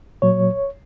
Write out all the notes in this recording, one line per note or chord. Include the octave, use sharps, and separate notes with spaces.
A#2 F#3 C#5